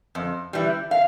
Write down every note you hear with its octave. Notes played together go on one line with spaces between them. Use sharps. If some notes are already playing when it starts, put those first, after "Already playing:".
F2
E3 G3
F5